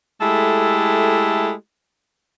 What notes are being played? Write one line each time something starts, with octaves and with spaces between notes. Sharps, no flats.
G#3 A3 E4 G4 A4